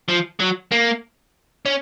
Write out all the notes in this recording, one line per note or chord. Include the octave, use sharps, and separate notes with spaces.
F3
F#3
A#3
C#4